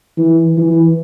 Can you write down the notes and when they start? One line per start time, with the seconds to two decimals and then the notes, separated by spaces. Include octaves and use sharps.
0.17 E3
0.57 E3